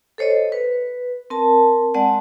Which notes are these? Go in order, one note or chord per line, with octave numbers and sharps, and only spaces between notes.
A4 C5 C#5 D#5
B4
C4 A#4 A5
G#3 C4 D5 F#5 A5